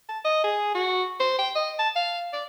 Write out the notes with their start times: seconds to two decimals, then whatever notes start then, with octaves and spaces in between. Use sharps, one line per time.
0.09 A5
0.25 D#5
0.44 G#4
0.75 F#4
1.20 C5
1.39 G5
1.55 D#5
1.79 A5
1.96 F5
2.33 D5